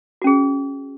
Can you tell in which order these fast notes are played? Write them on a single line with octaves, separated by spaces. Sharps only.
F#4 C#4 G#4